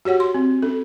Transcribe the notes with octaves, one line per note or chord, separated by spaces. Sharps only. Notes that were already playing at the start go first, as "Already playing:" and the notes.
F#4 G4 C#5 F#5
C6
C4
C#4 A4